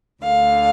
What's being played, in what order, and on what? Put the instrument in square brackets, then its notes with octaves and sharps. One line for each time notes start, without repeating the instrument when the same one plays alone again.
[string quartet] D2 D3 F5